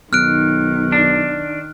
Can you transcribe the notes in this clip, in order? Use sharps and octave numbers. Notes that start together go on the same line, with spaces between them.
B1 D#3 F6 F#6 D7
D4